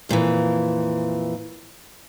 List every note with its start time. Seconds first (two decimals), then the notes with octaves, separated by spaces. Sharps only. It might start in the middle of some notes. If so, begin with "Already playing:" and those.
0.09 F2 A#2 D#3 E3